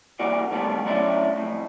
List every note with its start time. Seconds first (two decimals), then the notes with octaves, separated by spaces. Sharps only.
0.19 E3 G3 A#3 F#4 D5
0.51 G#2 D#3 G3 A3 B3
0.85 F#3 A3 C#4 E4 D5 E5
1.37 F2 A2